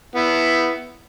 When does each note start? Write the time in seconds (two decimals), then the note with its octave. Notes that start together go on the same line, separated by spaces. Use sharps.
0.16 B3 E4